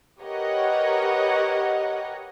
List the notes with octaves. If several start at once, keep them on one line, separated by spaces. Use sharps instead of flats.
G4 A#4 B4 C#5 D#5 F#5